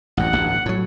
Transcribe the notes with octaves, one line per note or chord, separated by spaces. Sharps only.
A1 F#2 F#5
A1 D2 G2
A2 F#3